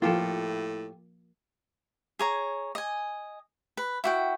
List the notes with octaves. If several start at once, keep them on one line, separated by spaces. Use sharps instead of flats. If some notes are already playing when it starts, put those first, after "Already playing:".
A2 F3 A#3 F4 G4 A4
G#4 C#5 A#5
D#5 G#5
B4
E4 F#4 G5